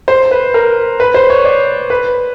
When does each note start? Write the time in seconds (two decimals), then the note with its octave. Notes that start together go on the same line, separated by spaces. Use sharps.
0.08 C5
0.31 B4
0.54 A#4
1.00 B4
1.14 C5
1.30 C#5
1.44 D5
1.90 B4